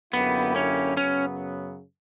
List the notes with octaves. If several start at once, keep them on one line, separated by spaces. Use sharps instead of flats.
F#2 D3 A#3 B3 E4 G4
C#4
F#2 C#3 F#3 B3 C#4